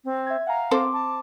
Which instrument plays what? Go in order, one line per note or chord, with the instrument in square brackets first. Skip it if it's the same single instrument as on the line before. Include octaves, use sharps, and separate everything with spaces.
[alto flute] C4
[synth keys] E5 G#6
[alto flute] F5 [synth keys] F#5 G#5 A#5
[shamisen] C4 A4 C5 [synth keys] C6 D6
[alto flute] A5